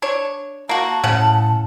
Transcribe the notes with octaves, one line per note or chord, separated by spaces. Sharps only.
D4 C#5
A#3 F#4 A5
A2 C#3 F#5